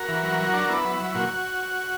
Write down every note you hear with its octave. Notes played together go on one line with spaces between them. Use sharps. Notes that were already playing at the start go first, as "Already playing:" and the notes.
Already playing: F#4 A#4
E3
F#3
F#3
D4
B3 E4
F#3
F#3
A#2 F#4